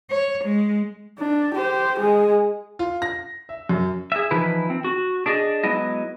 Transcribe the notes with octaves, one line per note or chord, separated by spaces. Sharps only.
C#5
G#3
D4
G4 C5
G#3 G#4
F4
A#6
E5
F#2
G#4 E5
E3 F3 D#4 E4 B4
C4
F#4
D4 G#4 D5 D#5
F#3 G#3 B3 E4 D#5